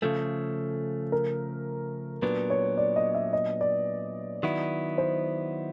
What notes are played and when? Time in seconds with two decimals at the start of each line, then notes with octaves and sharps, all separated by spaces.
0.02 C#3 F3 A3 A4
1.12 A#4
2.22 A#2 F#3 B3 D4 B4
2.50 C#5
2.78 D5
2.96 D#5
3.15 E5
3.33 D#5
3.61 D5
4.43 D#3 F#3 B3 E4
4.98 C5